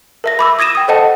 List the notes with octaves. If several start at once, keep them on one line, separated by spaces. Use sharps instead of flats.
A#4 E5 A#6
B5 D6 E6
D#6 G#6 A#6 D#7 E7
G5 D#6
A4 C5 D#5 F#5 A5